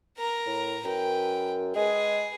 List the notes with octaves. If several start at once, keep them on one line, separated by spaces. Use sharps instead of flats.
A#4 A#5
A2
F#2 B4 G5
G#3 G#4 B4